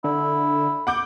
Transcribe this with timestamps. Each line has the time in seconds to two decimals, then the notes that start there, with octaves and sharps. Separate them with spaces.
0.04 D3 E4
0.87 F#5 D6 G6